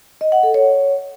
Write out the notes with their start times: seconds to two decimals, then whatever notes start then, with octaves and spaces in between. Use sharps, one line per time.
0.21 D#5
0.32 F#5
0.43 A4
0.54 C#5